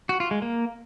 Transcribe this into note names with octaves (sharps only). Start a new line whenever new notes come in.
F#4
F4
G#3
A#3